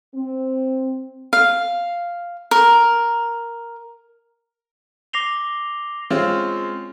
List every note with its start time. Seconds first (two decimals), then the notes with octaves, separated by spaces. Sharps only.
0.14 C4
1.33 F5
2.51 A#4
5.13 D6 A#6 C7 F7 G7
6.10 G#3 C4 C#4 F4